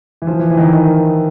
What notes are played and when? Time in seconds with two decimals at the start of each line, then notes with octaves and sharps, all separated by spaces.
0.22 E3
0.27 F3
0.39 E3
0.50 E3
0.57 D#3
0.61 E3
0.73 D#3